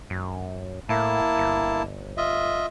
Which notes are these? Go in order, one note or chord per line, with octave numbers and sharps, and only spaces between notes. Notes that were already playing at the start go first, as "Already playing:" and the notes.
F#2
A2 A#3 E4 A5
G1
F4 D#5 E5